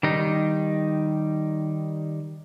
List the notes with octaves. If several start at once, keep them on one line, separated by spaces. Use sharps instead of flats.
D#3 G3 D#4